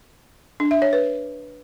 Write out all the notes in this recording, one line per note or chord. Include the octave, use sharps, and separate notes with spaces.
D4
E5
C#5
B4